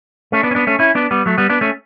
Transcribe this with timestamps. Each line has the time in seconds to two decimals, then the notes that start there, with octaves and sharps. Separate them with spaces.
0.32 A3 C#4
0.43 B3 D4
0.51 C#4
0.55 B3 D4
0.67 A3 C#4
0.79 C#4 E4
0.95 B3 D4
1.11 G3 B3
1.26 F#3 A3
1.38 G3 B3
1.50 B3 D4
1.61 A3 C#4